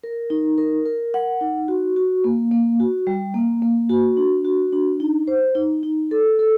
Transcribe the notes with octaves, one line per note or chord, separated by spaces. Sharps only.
A#4
D#4
A#4
A#4
F#5
D#4
F#4
F#4
A#3
A#3
F#4
G3
A#3
A#3
F#4
D4
F#4
D4
D#4
C5
D#4
D#4
A4
A4